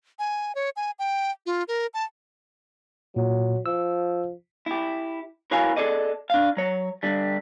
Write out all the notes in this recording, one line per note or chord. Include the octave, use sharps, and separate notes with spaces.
G#5
C#5
G#5
G5
F4
A#4
A5
A#2 F#3
F3 E6
E4 G4
E4 F#4 A#4 C#5 F5 G#5
G#4 A4 D5 D#5
D4 F5
F#3 C#5
G2 D3 G3